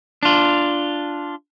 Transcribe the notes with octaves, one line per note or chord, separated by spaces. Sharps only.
D4 F4